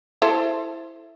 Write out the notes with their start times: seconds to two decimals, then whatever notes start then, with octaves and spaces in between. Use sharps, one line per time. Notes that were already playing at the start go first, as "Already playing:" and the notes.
0.22 E4 A4 C5